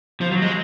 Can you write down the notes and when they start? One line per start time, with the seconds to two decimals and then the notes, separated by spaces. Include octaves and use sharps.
0.21 F3
0.31 F#3
0.42 G#3